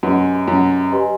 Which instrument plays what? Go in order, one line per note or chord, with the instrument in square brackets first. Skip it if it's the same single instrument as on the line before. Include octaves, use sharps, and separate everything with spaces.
[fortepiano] F#2 [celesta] G4 B4 D#5 G#5 C6
[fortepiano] F#2
[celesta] G4 B4 D#5 G#5 C6